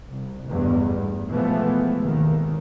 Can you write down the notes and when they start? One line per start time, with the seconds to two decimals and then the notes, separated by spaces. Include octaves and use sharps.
0.12 C2
0.48 A1 E2 G2
1.30 B2 E3 F3 G#3 A3 B3
1.98 G#1 D#2 D#3